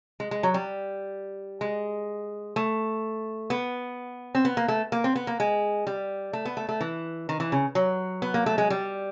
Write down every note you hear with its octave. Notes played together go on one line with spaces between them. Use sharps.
G#3
G#3
F#3
G3
G#3
A3
B3
C4
B3
A#3
A3
A#3
C4
B3
A#3
G#3
G3
A3
B3
A3
A3
E3
D#3
E3
C#3
F#3
B3
A#3
A3
G#3
G3